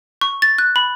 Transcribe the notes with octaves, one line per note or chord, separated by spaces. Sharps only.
C#6
A6
F#6
B5